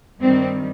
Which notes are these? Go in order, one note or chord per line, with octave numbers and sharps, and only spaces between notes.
G2 D#3 G3 C4